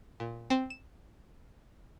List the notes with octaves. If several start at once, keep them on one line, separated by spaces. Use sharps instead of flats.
A#2
C4
E7